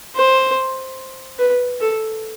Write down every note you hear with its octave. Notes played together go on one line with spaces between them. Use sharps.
C5
B4
A4